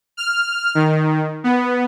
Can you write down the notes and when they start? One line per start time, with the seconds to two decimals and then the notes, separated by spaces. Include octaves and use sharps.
0.17 F6
0.75 D#3
1.44 B3